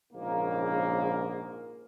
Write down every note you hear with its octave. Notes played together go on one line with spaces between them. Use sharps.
A#1 G#2 C#3 A#3